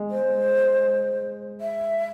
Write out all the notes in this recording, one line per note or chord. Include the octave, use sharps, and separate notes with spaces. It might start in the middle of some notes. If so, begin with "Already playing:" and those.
Already playing: G#3
C5
E5